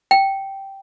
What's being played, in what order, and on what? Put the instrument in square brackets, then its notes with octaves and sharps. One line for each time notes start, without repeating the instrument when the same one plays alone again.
[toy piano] G5